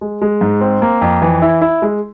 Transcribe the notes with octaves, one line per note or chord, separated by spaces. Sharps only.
G#3
G#3
G#2
C4
A#3
F2
E3
E4
E4
G#3